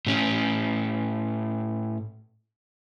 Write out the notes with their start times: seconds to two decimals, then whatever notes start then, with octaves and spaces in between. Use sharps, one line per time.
0.07 A2 C#4